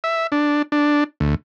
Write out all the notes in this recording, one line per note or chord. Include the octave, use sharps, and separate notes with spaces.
E5
D4
D4
D2